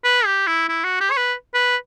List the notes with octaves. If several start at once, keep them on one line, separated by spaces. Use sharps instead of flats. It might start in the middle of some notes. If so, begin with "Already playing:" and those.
B4
G4
E4
E4
F#4
G4
C#5
B4
B4